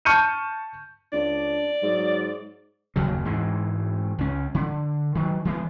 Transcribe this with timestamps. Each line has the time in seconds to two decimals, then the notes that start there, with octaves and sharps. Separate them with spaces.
0.05 A5 C#6 F6 G6 C#7 D#7
1.13 C#2 D4 D5
1.83 G#2 F#3
2.96 F#1 D#2 C#3 F#3
3.25 G#2 E3 G#3
4.18 C#2 C#4
4.55 D3
5.15 D#3 F#3
5.45 E3 G#3 A#3 B3